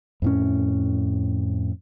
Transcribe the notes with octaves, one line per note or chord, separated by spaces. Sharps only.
F2 A2 C#4